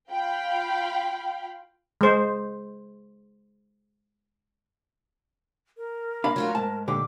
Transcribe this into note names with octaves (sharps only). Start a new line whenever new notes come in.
F4 F5 G5 B5
G#3 C5
A#4
D4 F5 B5
F#3 A3 F4
G#2 A5
A#2 D3 G4 D6